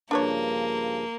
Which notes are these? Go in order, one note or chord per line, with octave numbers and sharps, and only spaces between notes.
G2 C#3 F3 A#3 D4 B4 C#5